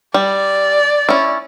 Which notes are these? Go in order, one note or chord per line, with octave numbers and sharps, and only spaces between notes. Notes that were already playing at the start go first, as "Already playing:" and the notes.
G3 D5
C#4 E4